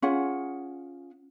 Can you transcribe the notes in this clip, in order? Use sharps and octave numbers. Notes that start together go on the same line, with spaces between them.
C#4 F4 G#4 F#5